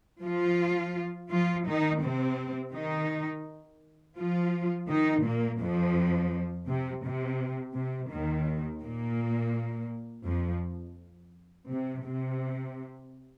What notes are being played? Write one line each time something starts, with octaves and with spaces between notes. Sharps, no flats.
F3 F4
F3 F4
D#3 D#4
C3 C4
D#3 D#4
F3 F4
D#3 D#4
A#2 A#3
F2 F3
C3
C3
C3
D#2 D#3
A#2 A#3
F2 F3
C3
C3